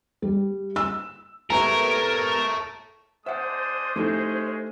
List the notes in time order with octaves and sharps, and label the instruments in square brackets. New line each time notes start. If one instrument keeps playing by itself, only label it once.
[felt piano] G3
E6
[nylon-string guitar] B3 E4 G4 [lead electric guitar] A4 C#5 [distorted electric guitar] A#4 [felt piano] A#5
[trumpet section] G#3 D4 D#6 [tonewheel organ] C5 [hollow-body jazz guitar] E5 F#5
[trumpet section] G#3 C#4 G#4 [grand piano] A3 [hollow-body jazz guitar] D#4 E4 G4